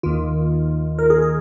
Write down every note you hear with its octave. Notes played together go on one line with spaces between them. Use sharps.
D#2 D#3 F4
A#4
G#4
G#4